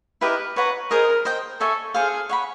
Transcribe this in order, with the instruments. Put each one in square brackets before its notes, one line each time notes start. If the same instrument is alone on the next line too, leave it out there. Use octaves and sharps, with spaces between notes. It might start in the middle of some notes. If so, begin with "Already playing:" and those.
[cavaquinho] E4 G4 A#4 D#5 [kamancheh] B4
[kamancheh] B4 [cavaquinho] C#5 F#5 A#5
[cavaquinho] G#4 C5 D#5 [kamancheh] A#4
[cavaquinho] C5 D#5 G5
[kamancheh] A4 [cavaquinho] C#5 E5 G#5
[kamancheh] G#4 [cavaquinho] A4 C5 F5
[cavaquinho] C#5 F#5 B5